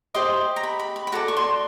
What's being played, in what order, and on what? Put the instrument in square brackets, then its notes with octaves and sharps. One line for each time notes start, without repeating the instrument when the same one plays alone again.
[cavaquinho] G4 C5 D#5 C6
A#5
B5
B5
B5
B5
F#4 A4 D5 A#5
C#6
C6